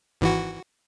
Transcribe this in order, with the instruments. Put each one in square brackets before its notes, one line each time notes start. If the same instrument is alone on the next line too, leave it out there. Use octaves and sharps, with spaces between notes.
[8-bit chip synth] G#1 E3 F#4